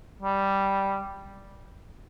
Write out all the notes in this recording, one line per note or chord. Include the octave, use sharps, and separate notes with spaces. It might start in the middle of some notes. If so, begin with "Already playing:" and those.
G3